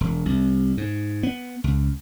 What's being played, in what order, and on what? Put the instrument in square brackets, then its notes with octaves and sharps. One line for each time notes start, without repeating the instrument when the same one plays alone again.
[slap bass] E1
C2
G#2
B3
C#2